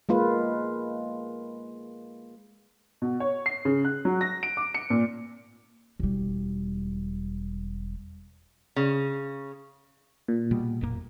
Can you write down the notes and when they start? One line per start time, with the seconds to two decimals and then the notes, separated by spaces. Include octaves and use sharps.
0.09 G#3 A#3 F4 B4
3.02 B2
3.20 C#5
3.46 C7
3.65 C#3
3.85 F#6
4.05 F#3
4.21 A#6
4.43 D7
4.57 D6
4.75 C#7
4.90 A#2
6.00 E1 G3
8.76 C#3
10.28 A#2
10.51 B2 G3
10.81 F#1 F2 A#3